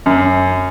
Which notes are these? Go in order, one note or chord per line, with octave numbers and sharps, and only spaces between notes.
F#2